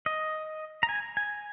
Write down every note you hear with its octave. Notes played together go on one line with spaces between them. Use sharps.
D#5
A#5
G#5
G#5